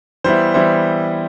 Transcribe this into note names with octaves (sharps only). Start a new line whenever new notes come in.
E3 G3 B3 E4 C5
E3 G3 B3 E4 C5